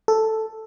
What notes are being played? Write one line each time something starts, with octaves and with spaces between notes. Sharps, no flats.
A4